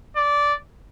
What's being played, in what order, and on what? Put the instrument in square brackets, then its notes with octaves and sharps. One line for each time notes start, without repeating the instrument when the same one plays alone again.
[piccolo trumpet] D5